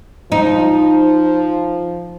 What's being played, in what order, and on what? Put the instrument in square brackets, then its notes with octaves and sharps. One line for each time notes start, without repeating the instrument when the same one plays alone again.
[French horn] F3 [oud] D#4